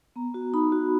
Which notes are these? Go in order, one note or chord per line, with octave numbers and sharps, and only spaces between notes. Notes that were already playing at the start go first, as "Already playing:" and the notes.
B3 A#5
F#4
D#4 B5
F#4